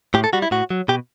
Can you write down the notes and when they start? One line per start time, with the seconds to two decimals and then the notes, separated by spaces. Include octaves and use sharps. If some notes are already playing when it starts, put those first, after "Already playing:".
0.14 A2 G4
0.24 A4
0.33 G3 F#4
0.42 E4
0.51 A2 F#4
0.70 F#3
0.88 B2 G4